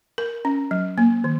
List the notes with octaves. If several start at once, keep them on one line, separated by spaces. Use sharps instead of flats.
A#4
C#4
F#3
A#3
D#3